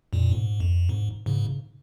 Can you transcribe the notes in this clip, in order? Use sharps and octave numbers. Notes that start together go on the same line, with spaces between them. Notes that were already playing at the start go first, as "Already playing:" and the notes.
F2 A#2
G#2
F2
G#2
G#2 C#3